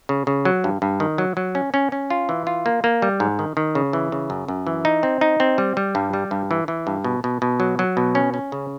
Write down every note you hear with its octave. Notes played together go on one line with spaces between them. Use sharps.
C#3
C#3
F#3
G2
G2
D#3
F#3
F#3
C#4
C#4
C#4
F4
E3
F4
A#3
A#3
G3
G#2
D#3
D#3
C#3
E3
C#3
F#2
F#2
E3
D#4
C4
D#4
C4
G3
G3
G2
G3
G2
E3
E3
G2
B2
B2
B2
F#3
F#3
B2
C#4
C#4
C#3